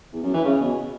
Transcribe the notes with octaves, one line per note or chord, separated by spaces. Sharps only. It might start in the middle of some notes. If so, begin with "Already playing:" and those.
E2
F#2
E3
C#3
B2